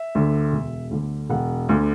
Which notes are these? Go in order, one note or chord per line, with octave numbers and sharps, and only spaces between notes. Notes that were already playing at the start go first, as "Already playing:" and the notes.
Already playing: E5
D2 D3
E1
D2 D3
E1 F#5
D2 D3